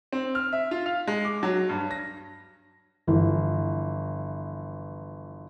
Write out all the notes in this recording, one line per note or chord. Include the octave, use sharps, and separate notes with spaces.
C4
F6
E5
F4
F5
G#3
D6
F#3
G2
A#6
G1 E3 F3